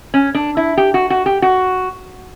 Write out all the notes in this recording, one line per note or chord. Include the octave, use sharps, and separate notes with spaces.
C#4
D4
E4
G4
F#4
F#4
G4
F#4